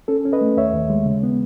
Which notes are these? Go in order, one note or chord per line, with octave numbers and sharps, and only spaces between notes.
C#4 A4
C#4
B4 D#5
A3
D#2 C#5 E5
D#2
G#3
C#3
B3